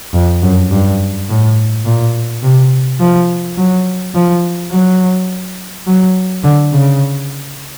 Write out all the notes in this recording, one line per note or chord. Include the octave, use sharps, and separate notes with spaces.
F2
F#2
G2
A2
A#2
C3
F3
F#3
F3
F#3
F#3
D3
C#3